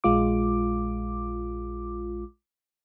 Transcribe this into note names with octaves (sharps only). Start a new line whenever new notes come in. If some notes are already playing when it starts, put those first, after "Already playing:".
A#1 G#3 F4 D6